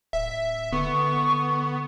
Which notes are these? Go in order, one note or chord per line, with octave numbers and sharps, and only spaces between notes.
D1 E5
D3 B3 C#6